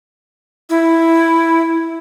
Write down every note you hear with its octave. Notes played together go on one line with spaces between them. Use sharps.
E4